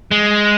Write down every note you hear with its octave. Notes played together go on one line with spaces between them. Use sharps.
G#3